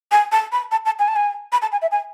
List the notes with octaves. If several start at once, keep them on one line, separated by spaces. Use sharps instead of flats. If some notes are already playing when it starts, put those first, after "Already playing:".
G#5
A5
B5
A5
A5
G#5
A5
G#5
B5
A5
G#5
E5
G#5